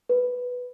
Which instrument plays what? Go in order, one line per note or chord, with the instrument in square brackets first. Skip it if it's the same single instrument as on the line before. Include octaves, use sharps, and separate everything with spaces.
[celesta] B4